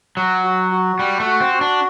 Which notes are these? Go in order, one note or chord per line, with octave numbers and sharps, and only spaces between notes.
F#3 F#5
F#4
F#4
G3 F#5
A3
F#4
C4
F#4
D4